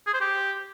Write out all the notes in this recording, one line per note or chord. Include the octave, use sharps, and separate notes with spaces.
G#4
C5
G4